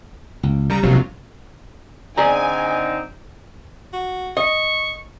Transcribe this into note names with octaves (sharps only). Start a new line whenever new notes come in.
C#2
C#3 G3 A#5
E1 A#1 D#2 C3 F#3 F4
D3 C4 D#4 G#4 D5 G#5 A#5
F#4
D#5 C#6